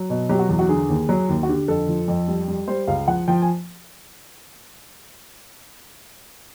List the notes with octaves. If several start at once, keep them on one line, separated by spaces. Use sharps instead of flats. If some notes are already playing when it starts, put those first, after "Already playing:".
Already playing: F#3
B2
F#3 G4
F#4
E2
F#4
D3 G#4
D#2
F#3
D#2
F#4
D3 G4
F2 A4
F3
F2
G3
G3
G3 C5
C#2 F5
F3 F#5
F3 G5
G#5